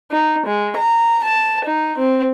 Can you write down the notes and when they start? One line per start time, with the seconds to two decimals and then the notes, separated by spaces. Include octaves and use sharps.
0.12 D#4
0.47 G#3
0.77 A#5
1.25 A5
1.66 D#4
1.99 C4